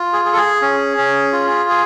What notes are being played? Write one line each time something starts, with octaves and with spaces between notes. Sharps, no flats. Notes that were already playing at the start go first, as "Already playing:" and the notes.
Already playing: F4
G#4
G#4
A4
G#4
C#4
C#4
F4
G#4